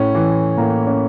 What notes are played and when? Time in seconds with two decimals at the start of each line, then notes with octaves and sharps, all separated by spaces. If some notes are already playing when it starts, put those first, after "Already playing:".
Already playing: A2 C#4
0.15 E3
0.57 A2 A#3
0.87 C#4